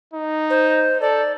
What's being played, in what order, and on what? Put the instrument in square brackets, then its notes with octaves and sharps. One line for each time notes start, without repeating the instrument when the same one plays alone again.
[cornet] D#4
[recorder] C5
[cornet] A4 [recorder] D5